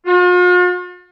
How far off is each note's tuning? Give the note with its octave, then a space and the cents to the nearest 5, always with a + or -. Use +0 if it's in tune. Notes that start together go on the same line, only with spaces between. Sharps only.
F4 +45